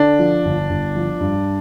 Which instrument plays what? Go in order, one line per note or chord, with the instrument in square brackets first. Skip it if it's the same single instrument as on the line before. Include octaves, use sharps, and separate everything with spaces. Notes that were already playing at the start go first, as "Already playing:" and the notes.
Already playing: [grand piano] D3 [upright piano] D4
[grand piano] F3
G1
G1
F3
G2